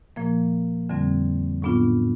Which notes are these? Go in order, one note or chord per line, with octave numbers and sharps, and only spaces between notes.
A#2 F3 A#3
F2 D3 G3 C4
A2 F#3 B3 D4 F4